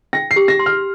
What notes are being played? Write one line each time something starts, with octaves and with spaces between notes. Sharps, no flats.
G5 A#6
C7
G4
A#6
C6
F6